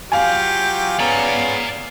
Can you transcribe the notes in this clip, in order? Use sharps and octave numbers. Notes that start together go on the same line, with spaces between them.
F#3 F4 G4 F5 G#5
B3 C#4 G#4 D5 A#5